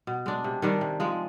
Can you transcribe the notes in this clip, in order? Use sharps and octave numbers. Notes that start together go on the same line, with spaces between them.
B2
G#3 D4
C3
D#3 G3 D4
C3
F3 G#3